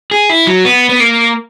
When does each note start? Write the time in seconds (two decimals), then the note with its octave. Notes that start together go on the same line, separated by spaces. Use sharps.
0.11 G#4
0.30 E4
0.47 F#3
0.65 B3
0.89 B3
1.00 A#3